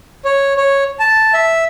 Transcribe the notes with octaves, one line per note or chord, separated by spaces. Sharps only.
C#5
C#5
A5
E5